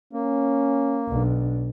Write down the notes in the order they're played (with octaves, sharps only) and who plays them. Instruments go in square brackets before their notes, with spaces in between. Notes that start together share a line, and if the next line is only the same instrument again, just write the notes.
[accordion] A#3 [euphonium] C#4
[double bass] B1 D4